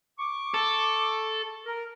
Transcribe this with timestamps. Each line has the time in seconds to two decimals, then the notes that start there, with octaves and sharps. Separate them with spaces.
0.19 C#6 D6
0.54 A4
1.66 A#4